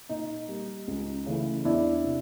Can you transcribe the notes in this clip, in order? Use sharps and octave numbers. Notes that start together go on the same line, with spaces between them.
A#2 D#4
G3 A#3
C#2
C#3 E3 A3
E2 D4 E4
C3